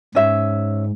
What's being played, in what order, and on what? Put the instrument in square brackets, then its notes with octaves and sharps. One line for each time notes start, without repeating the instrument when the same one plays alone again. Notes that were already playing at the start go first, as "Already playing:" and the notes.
[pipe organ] G#2 [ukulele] C#4 E5